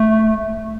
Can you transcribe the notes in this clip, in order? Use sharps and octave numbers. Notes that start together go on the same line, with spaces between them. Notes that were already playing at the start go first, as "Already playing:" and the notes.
Already playing: A3